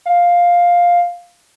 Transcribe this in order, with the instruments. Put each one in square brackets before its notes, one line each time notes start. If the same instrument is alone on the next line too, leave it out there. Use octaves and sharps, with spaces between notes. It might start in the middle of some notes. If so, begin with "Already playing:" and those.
[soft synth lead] F5